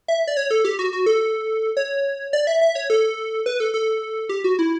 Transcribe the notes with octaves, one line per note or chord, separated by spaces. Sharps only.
E5
D5
C#5
A4
G4
F#4
F#4
A4
C#5
D5
E5
E5
C#5
A4
B4
A4
A4
G4
F#4
E4